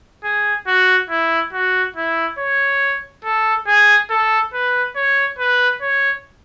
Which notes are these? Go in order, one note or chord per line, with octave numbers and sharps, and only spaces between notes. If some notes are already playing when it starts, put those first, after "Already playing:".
G#4
F#4
E4
F#4
E4
C#5
A4
G#4
A4
B4
C#5
B4
C#5